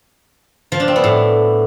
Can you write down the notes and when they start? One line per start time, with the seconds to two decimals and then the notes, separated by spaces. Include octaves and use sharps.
0.72 F3
0.80 D4
0.88 C4
0.96 B3
1.04 A2